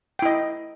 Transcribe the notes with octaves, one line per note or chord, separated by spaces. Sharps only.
E4 D#5 G5